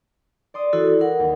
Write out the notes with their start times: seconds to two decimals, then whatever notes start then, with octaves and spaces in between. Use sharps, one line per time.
0.54 D5 C6 D#6
0.73 E3 E4 F#4 A4 C#5
1.01 A#4 F#5
1.19 D#2